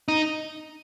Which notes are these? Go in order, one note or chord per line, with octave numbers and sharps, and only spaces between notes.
D#4